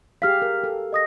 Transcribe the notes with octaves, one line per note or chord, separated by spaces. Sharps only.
G4 G#4 F5 F6 B6
A#4
A4
D#5 D#6 A#6